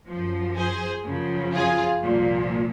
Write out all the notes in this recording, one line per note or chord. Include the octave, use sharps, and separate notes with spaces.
F#2 F3
G#4 C5
F#2 C#3 F3
F4 G#4
C2 A#2 F3